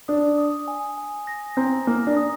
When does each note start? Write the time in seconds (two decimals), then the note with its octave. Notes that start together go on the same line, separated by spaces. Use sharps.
0.08 D4 D#6
0.38 D#6
0.68 G#5
0.98 G#5
1.27 A#6
1.57 C4 A#5
1.87 A#3 A#6
2.07 D4
2.17 D#6